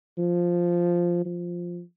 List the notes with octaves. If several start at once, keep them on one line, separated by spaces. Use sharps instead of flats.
F3
F3